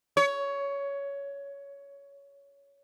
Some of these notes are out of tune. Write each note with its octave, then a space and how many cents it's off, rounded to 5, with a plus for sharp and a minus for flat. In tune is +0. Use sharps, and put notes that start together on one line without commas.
C#5 +15